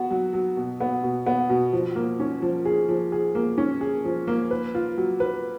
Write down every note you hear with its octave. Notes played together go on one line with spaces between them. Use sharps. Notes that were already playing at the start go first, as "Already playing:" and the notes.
Already playing: B3 F#4
F#3
F#3
B2
B3
B2
B3
B2
F3
A#3
C#4
F3
G#4
F3
G#4
A#3
C#4
G#4
F3
A#3
B4
F4
F#3
B4